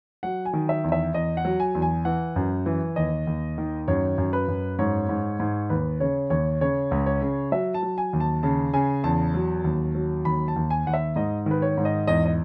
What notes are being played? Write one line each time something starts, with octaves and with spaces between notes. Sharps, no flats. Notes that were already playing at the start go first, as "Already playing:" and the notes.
F#3 F#5
G#5
D#3
E5
E2
E5
E2 D#5
F#5
F#3
G#5
E2
G#5
E3 F#5
F#2
E3
D#2 D#5
D#2
D#3
F#2 C#5
F#2
B4
F#2
G#2 C#5
G#2
G#2
D#2 B4
C#3 C#5
D#2 C#5
C#3 C#5
C#2
C#5
C#3
F#3 E5
A5
F#3
G#5
D#2
A5
C#3 A5
C#3 G#5
E2 A5
F#3
D#2
F#3
D#2 B5
A5
D#2
G#5
D#2 F#5
E5
G#2 D#5
D#3 B4
C#5
G#2
D#5
E2 D#5
D#5